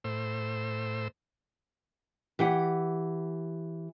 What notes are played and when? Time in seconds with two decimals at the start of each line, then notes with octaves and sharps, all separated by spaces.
0.04 A2 C5 E6
2.39 E3 G4 F#5